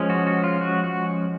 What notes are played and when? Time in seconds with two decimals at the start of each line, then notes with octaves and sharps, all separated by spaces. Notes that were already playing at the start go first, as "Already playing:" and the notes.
Already playing: F3 G#3 C#4
0.10 F#4
0.27 F#4
0.44 F4
0.61 F#4
0.84 F#4